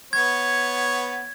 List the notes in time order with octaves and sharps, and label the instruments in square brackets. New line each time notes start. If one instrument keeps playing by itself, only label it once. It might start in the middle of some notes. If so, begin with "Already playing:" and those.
[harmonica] B3 C#5 [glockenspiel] G#6